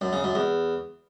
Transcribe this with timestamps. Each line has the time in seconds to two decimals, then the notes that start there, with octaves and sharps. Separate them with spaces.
0.01 F#2
0.13 C#3
0.24 F#2
0.35 E2